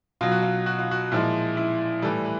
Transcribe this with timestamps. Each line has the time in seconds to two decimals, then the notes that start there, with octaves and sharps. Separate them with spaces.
0.21 B2 F#3 F4
0.32 F#4
0.42 F4
0.66 F#4
0.79 F4
0.91 F#4
1.12 A#2 F3 G#3 E4
1.57 E4
2.02 A2 E3 G3 A4
2.25 B4